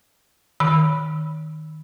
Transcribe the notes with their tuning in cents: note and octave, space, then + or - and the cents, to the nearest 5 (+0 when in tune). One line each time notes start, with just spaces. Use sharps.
D#3 +0 B5 +0